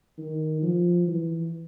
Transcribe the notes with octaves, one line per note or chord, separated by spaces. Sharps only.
D#3
F3
E3